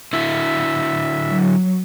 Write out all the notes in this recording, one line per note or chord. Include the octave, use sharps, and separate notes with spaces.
D3 E4 F#4 E5
F#3